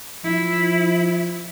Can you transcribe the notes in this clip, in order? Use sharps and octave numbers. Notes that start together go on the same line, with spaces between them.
F3 E4